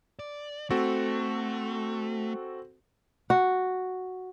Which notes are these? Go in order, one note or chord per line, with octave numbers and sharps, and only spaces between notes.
D5
A3 C4 F#4 A4
F#4